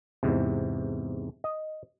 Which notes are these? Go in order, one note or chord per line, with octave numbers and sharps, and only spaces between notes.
E2 G#2 C3
D#5